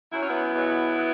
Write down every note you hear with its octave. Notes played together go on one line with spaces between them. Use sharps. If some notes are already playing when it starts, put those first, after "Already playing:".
F#2 F#3 E4
C#4
B3 E4
E2 B2 F#3
F#3